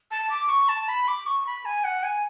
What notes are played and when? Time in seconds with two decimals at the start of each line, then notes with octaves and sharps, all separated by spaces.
0.11 A5
0.30 D6
0.49 C#6
0.69 A5
0.88 B5
1.08 D6
1.26 C#6
1.46 B5
1.65 G#5
1.84 F#5
2.03 G#5